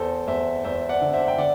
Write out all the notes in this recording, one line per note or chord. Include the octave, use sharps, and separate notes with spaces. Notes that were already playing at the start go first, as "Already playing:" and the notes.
Already playing: E2 A4 C5
E2 C5 E5
E2 C5 E5
D5 F#5
D3
C5 E5
G5
D3 D5 F#5